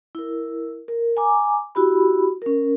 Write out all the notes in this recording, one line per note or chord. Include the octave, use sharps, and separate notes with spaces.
E4 A#4
A#4
G#5 A#5 D6
E4 F#4 G4 B5
C#4 A#4